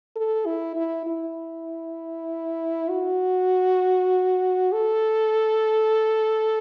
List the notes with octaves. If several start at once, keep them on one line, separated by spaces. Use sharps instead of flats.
A4
E4
E4
E4
F#4
A4